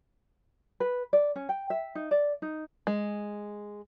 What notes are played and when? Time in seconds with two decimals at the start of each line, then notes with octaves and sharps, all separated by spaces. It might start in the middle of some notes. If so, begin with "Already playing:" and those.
0.80 B4
1.13 D5
1.36 C#4
1.49 G5
1.70 E5
1.95 D#4
2.11 D5
2.42 D#4
2.87 G#3